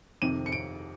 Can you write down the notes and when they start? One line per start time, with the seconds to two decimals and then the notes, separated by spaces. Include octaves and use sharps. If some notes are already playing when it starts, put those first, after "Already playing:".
0.22 F2 C3 D#3 D#7
0.46 C#7
0.52 D7